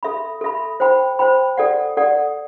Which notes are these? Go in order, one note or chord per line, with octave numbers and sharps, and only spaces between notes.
A4 E5 B5
A4 E5 B5
C5 G5 B5
C5 G5 B5
A4 D5 F#5
A4 D5 F#5